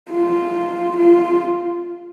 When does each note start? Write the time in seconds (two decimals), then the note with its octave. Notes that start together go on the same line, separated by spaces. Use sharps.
0.11 F4
0.97 F4